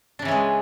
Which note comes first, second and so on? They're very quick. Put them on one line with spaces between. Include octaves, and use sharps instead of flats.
D4 C#3 E3 C#4 G#3